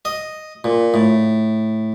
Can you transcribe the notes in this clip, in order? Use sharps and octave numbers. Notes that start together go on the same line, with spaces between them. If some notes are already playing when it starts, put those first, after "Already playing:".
D#5
A#2
A2